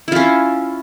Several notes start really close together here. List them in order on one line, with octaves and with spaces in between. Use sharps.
E4 F4 C#4